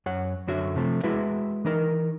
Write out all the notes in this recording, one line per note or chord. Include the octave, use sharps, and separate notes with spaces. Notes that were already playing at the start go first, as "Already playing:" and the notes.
F#2 C#5 F#5
F#2 D3 F#4 C#5 E5
C3 F3 A3
G#3 E4 F#4 B4 E5
E3 D#4 A#4